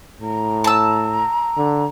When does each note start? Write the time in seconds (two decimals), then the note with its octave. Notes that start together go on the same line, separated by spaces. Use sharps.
0.21 A2 A#5
0.64 A5 E6
1.57 D3